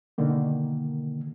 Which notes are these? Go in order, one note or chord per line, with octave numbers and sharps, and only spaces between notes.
B2 D3 D#3 A#3